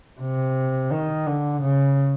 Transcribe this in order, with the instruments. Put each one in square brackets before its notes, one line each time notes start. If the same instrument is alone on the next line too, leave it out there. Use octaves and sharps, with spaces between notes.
[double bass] C3
D#3
D3
C#3